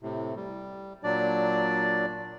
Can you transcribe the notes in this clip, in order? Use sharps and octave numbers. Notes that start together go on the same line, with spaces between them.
A2 C3
G3
A#2 F#3 D4 D5